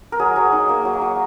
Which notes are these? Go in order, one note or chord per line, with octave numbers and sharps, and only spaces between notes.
A#4
F#3 G#4
F#3
D#4
A#3
F#3
F#3